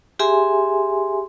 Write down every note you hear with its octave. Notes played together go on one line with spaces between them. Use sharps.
G4 G#4 E5 G#5 C6